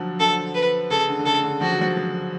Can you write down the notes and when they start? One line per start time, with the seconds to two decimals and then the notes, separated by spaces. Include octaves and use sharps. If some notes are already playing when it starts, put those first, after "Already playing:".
Already playing: D3 F3 F#3
0.20 D3 A4
0.55 B4
0.90 C#3 A4
1.09 D3
1.19 D3
1.26 C#3 A4
1.44 D3
1.61 F3 F#4
1.71 F#3
1.81 F3
1.97 F3